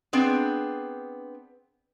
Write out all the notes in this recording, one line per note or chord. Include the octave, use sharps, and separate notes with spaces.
B3 C4 D4 G#4